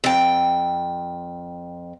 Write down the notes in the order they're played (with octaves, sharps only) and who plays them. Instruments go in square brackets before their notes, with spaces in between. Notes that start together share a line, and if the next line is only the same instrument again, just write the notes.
[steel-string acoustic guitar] F2 G5